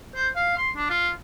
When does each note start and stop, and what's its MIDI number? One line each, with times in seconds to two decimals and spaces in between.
0.15 0.28 72
0.36 0.57 77
0.58 0.69 84
0.77 0.89 62
0.90 1.09 65